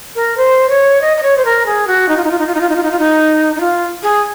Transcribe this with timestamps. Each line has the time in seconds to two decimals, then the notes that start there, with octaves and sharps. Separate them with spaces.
0.15 A#4
0.37 C5
0.69 C#5
1.01 D#5
1.17 D#5
1.23 C#5
1.37 C5
1.45 A#4
1.66 G#4
1.87 F#4
2.08 D#4
2.17 F4
2.24 D#4
2.31 F4
2.38 D#4
2.47 F4
2.54 D#4
2.60 F4
2.69 D#4
2.76 F4
2.83 D#4
2.91 F4
2.99 D#4
3.56 D#4
3.60 F4
4.03 G#4